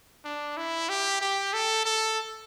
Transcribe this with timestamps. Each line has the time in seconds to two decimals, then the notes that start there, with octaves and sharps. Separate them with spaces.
0.25 D4
0.57 E4
0.89 G4
1.21 G4
1.53 A4
1.85 A4